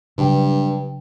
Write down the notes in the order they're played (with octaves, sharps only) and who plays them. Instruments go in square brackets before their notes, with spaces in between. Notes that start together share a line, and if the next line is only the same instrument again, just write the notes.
[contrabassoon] G2 [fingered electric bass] C#3 F#3 [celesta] B4 G5